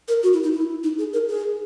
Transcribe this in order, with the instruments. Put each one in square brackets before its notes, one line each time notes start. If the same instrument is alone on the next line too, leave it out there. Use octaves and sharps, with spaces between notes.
[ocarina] A#4
F#4
E4
D#4
E4
D#4
G#4
A#4
G#4